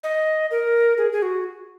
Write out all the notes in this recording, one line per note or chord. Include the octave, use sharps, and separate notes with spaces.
D#5
A#4
G#4
G#4
F#4